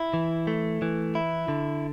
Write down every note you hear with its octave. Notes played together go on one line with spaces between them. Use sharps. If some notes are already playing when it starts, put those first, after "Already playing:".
Already playing: E4
E3
A3
E3
E4
D3